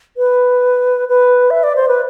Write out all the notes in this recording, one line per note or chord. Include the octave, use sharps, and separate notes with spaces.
B4
B4
E5
D5
C5
B4